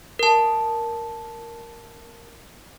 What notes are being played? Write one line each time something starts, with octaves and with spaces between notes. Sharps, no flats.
A#4 A5